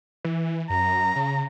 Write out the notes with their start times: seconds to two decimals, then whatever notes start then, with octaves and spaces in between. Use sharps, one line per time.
0.25 E3
0.70 F#2 A#5
1.16 C#3